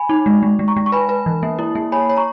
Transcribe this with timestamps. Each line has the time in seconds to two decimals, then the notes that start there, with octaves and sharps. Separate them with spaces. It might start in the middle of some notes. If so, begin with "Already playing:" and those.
Already playing: G#5 B5
0.09 D#4
0.26 G#3
0.43 G#3
0.59 G#3
0.68 A#5 C#6
0.76 G#3
0.86 C#6
0.92 B4 G#5 B5
1.09 B4
1.26 E3
1.43 A#3
1.59 E4
1.75 A#3
1.92 C#5 G#5 B5
2.05 C#5 B5
2.17 A#5 C#6